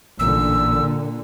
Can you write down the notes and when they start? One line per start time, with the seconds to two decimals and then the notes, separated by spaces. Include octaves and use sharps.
0.19 A1 A#2 D3 E6